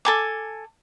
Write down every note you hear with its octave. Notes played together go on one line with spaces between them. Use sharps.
A4 G#5 D6